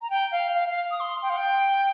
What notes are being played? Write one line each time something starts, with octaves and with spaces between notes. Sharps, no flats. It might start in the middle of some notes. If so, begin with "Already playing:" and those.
A#5
G5
F5
F5
F5
D#6
C6
G5
F5
G5